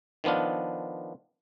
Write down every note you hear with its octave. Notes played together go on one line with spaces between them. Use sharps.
D#3 F3 B3 D4 F4